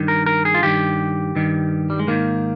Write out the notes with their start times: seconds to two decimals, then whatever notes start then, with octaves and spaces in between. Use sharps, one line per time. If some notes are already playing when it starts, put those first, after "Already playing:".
Already playing: G2 D#3
0.08 A#4
0.26 A#4
0.45 G#4
0.54 F4
0.63 G2 D#3 G4
1.35 G2 D#3
1.90 G3
1.99 G#3
2.07 G#2 D#3 A#3